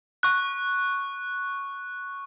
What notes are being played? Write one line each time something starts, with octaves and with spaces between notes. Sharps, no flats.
C#6 F#6